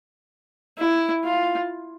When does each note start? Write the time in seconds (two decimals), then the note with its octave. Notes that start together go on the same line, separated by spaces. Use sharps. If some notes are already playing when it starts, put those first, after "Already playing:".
0.78 E4
1.25 F4